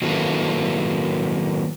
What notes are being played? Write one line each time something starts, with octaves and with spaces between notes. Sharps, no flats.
D#3 F#3 A#3 E4 A4 B4